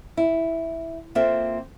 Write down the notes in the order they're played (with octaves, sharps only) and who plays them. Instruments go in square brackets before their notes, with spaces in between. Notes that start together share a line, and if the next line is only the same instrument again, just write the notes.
[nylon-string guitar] E4
A#3 C4 F4 A4 E5